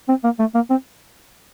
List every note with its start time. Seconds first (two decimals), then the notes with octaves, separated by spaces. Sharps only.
0.09 C4
0.24 A#3
0.39 A3
0.55 A#3
0.70 C4